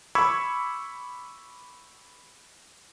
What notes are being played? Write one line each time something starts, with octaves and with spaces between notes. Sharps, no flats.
B5 C#6 D6 E6 G#6